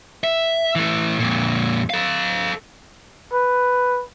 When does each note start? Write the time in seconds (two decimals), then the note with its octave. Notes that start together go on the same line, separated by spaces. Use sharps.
0.24 E5
0.75 E3 A3
1.19 F2 A#2
1.90 A4 F5
3.33 B4